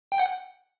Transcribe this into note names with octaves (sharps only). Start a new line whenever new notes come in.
G5
F#5